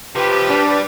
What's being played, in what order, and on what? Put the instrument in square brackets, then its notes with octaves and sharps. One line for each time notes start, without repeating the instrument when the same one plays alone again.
[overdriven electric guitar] C3 F3 [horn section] G4 [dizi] B4
[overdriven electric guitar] G3 [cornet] D4